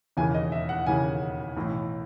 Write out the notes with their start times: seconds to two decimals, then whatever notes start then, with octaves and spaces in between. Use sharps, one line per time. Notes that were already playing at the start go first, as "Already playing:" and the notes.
0.17 E1 D#2 C#3 E3 G#5
0.34 D#5
0.52 E5
0.69 F#5
0.86 E1 D#2 C#3 E3 G#5
1.56 B1 A2 E3